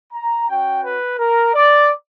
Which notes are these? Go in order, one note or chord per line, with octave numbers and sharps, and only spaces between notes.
A#5
C#4 F#4 G5
B4
A#4
D5